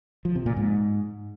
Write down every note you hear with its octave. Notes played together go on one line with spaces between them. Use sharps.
F3
C3
A#2
G#2